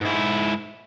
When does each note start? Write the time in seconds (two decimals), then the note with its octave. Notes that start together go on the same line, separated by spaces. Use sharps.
0.01 G#2 E4